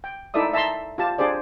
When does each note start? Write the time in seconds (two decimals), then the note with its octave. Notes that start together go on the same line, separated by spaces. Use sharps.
0.04 G5
0.34 D#4 E4 A4 D5 E5 D#6
0.53 E5 A5 A#5 C6
0.98 F4 G4 A5
1.18 D4 G4 G#4 C5 D5